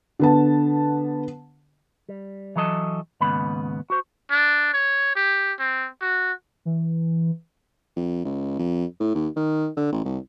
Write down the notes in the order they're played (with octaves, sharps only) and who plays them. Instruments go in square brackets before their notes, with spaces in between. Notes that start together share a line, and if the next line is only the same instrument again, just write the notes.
[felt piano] D3 B3 A5
[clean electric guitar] G3
E3 F#3 A4 D#5 A5
D#2 G#2 C#3 B3 B5
F#4 C5
[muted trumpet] D4
C#5
G4
C4
F#4
[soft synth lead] E3
[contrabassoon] F2
C#2
F2
A2
D#2
D#3
D3
A1
C2